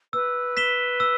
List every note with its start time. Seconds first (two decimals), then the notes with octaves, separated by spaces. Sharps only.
0.13 B4 E6
0.57 B6 E7 G7
1.00 E6